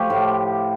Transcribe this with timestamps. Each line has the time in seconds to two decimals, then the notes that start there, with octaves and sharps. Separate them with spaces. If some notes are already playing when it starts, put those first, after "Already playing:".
Already playing: F3 A3 G4
0.10 A2